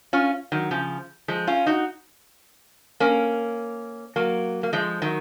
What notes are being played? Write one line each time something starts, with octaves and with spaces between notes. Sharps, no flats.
C#4 F4
D#3 F#3
C#3 F3
F3 G#3
C#4 F4
D#4 F#4
A#3 C#4
F#3 A#3
A#3
F3 G#3
D#3 F#3